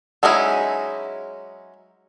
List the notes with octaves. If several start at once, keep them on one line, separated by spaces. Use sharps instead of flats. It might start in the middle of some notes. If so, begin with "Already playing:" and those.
F#3 G#3 C#4 D#4 E4